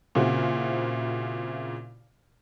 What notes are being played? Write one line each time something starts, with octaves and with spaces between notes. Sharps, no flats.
A#2 C#3 C4 E4 F#4